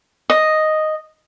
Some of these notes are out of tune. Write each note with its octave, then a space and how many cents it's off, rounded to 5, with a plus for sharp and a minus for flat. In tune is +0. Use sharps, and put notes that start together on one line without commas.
D#5 +0